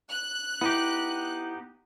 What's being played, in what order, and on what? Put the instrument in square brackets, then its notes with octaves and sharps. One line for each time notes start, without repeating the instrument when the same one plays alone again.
[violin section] F#6
[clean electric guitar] B3 D#4 G4 [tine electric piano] E4